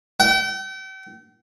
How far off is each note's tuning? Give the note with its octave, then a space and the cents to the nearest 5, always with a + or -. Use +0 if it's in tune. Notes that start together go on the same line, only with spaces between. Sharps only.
G5 -40